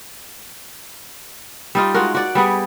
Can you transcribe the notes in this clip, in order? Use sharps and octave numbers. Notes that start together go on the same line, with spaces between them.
G3 D#4 F4
G#3 F4 F#4 A#4
F#4 D5
G3 B3 G#4